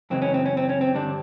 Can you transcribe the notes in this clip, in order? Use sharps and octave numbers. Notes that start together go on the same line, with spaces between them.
F#2 C#3 E3 G#3 C4
C#4
C4
C#4
C4
C#4
C4
G2 D3 G3 D4